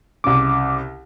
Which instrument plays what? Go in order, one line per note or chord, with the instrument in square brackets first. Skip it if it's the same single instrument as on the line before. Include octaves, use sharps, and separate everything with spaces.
[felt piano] C2 C#3 [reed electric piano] D6